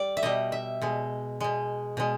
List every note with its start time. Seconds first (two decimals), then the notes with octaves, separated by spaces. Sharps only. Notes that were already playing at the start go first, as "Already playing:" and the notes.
Already playing: G3 D5
0.17 E5
0.23 B2 G3 D#5
0.52 E5
0.82 B2 G#3
1.40 B2 G#3
1.97 B2 G#3